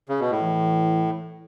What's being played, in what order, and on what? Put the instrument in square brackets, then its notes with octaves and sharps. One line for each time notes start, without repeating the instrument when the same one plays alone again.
[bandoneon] C#3
B2
A2
[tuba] E3